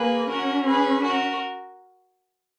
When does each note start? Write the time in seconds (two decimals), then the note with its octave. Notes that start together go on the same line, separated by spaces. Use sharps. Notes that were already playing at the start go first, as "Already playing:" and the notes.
Already playing: A#3 G#4 B4
0.29 C#4 F#4 A#4
0.66 G#4 B4
1.02 F#4 A#4